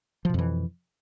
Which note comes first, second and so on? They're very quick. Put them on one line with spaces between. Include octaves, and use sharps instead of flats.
F3 B2 F2 E3